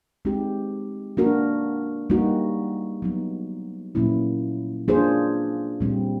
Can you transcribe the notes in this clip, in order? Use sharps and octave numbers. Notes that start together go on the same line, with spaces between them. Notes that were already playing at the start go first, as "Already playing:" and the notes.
G#3 C4 D#4 G4
A#3 D4 F#4 A#4
G3 A#3 D#4 F#4
F#3 B3 D#4
A#2 F#3 A#3 C#4 E4
A#3 D4 F4 G#4 C5
A#2 G3 C4